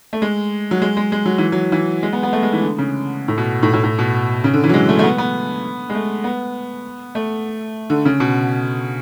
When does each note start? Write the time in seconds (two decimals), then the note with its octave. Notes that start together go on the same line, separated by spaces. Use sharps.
0.13 A3
0.22 G#3
0.71 F#3
0.82 G#3
0.97 G#3
1.12 G#3
1.26 F#3
1.38 E3
1.52 F#3
1.72 E3
2.03 G#3
2.13 B3
2.23 B3
2.33 A3
2.43 G#3
2.53 E3
2.62 D3
2.79 C#3
3.28 A2
3.38 B2
3.63 A2
3.73 A2
3.84 A2
3.99 B2
4.44 C#3
4.54 D3
4.64 E3
4.69 F#3
4.74 G#3
4.89 A3
4.99 A3
5.03 B3
5.18 B3
5.90 G#3
5.95 A3
6.24 B3
7.15 A3
7.90 D3
8.05 C#3
8.20 B2